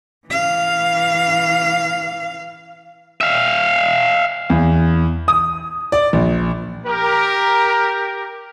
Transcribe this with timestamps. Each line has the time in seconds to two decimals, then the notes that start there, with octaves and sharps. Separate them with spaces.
0.28 E3 F5
3.21 E5 F5
4.50 E2
5.28 D#6
5.92 D5
6.13 A#1
6.87 G4 A#4